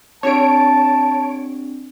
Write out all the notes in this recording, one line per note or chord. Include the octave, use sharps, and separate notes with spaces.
C4 D4 G4 C#5 A5 D7